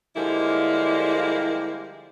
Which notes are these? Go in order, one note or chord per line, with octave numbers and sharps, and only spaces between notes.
D3 F3 G3 G#3 A#3 E4